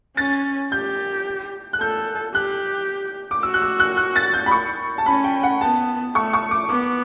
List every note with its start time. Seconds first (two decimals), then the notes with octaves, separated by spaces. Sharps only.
0.17 C#4 A6
0.72 G4 G6
1.73 F#6
1.80 A4 G6
2.35 G4 F#6
3.31 D6
3.43 F#4 E6
3.54 F#6
3.62 E6
3.80 F#6
3.97 F#6
4.16 A6
4.34 G6
4.46 B5
4.51 C#6
4.98 A5
5.06 C#4 B5
5.24 G5
5.43 F#5
5.61 B3 A5
6.15 A3 C#6
6.33 C#6
6.51 D6
6.69 B3 D6